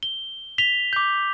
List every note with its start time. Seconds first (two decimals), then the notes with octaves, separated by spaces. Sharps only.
0.03 G7
0.58 B6 F7 G7
0.93 D6 G6